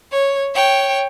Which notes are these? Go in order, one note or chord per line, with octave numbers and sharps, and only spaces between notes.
C#5
C#5 G5